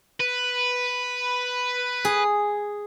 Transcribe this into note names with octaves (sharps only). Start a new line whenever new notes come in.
B4
G#4